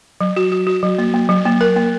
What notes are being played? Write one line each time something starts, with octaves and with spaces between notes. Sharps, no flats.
F#3
F#4
F#4
F#4
F#3
A#3
A#3
F#3
A#3
A#4
A#3